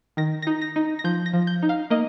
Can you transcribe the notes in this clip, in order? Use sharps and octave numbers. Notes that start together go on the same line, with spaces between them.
D#3 A#6
D#4 A#6
A#6
D#4
A#6
F3 G6
A#6
F3
G6
D#4
F5
A#3 D#5